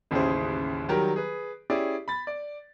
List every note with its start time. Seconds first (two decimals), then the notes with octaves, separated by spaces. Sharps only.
0.11 A1 D#2 C#3 E4 G#4 C5
0.89 D#3 F#3 G3 G4 A#4
1.16 G#4 B4
1.70 C#4 E4 G4 G#4 D5
2.08 B5 A6
2.27 D5